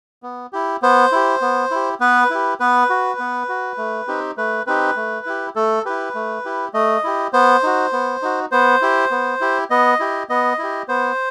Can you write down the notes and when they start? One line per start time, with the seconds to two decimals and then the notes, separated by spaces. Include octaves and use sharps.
0.23 B3
0.53 E4 G4
0.82 B3 C5
1.12 E4 G4
1.41 B3
1.71 E4 G4
2.00 B3 B4
2.30 E4 G4
2.60 B3 B4
2.90 F#4
3.19 B3
3.49 F#4
3.78 A3
4.08 C4 D#4 G4
4.37 A3 B4
4.67 C4 D#4 G4 B4
4.96 A3
5.26 E4 G4
5.55 A3 A4
5.85 E4 G4 B4
6.15 A3
6.45 E4 G4
6.74 A3 D#5
7.04 E4 G4
7.33 B3 C5
7.63 D#4 F#4
7.93 B3
8.22 D#4 F#4
8.52 B3 C5
8.82 E4 G4
9.11 B3
9.41 E4 G4
9.70 B3 D#5
10.00 E4 G4
10.30 B3 D#5
10.59 E4 G4
10.88 B3 C5